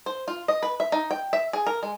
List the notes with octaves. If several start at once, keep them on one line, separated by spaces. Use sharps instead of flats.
C5
F4
D#5
B4
E5
D#4
G5
E5
G#4
A#4
G#3